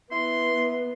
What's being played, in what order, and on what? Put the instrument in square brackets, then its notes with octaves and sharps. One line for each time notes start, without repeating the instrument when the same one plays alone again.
[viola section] B3 [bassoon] E4 [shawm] C6